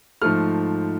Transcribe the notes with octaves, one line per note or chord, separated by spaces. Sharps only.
G#2 F3 A3 F6